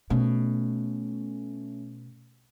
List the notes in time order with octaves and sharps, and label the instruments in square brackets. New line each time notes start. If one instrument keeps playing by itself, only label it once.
[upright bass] B2 [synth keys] A3 C#4